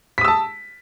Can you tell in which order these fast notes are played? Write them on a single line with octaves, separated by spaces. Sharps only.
B6 D#6 E6 A5